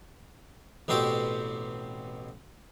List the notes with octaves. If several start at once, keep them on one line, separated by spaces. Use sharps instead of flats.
A1 B2 C4 G4 D6